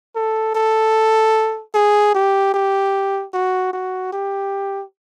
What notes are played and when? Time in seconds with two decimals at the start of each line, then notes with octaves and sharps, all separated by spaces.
0.15 A4
0.55 A4
1.74 G#4
2.14 G4
2.54 G4
3.34 F#4
3.73 F#4
4.13 G4